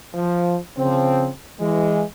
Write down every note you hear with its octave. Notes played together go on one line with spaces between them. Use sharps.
F3
C#3 F3 C4
E3 G#3